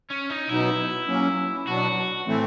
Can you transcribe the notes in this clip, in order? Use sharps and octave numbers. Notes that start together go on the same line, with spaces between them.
C#4
D#4
B2 F#3 B3 D#4 E4
F#3 A#3 C#4
B2 F#3 B3 D4 F#4
A2 E3 A3 C4